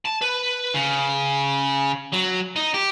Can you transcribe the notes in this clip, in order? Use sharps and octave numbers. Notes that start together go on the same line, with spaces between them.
A5
B4
C#3
F#3
D#4
G4